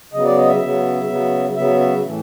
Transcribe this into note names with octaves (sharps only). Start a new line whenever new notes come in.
C#3 F#3 B3 D#5
D5
D#5
E5
C#3 F#3 B3
C#3 F#3 B3
C#3 F#3 B3 E5
E5
A2 E3 A3